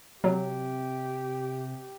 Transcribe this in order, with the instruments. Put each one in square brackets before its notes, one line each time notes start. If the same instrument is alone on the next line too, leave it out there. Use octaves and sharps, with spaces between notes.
[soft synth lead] C3 [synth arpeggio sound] F#3 [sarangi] G4